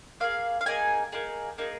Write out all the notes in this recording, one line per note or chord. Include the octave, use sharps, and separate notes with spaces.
A#3 D#4 G#4 F5
F5
A#3 D#4 G#4 G#5
A#3 D#4 G#4
A#3 D#4 G#4